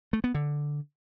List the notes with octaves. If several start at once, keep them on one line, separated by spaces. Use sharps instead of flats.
A3
B3
D3